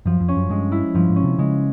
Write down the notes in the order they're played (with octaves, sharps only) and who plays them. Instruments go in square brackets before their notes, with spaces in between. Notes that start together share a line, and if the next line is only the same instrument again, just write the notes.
[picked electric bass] F#2 [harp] F3
[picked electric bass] F2
[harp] C#4
[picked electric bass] F#2
[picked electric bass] G2 [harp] G#3
[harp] E4
[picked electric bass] G2 [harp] F3
[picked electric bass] G#2
[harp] C#4
[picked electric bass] C3
[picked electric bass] C#3 [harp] G#3